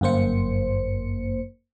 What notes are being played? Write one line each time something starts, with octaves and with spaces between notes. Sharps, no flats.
G1 F#2 A#3 C5 C#7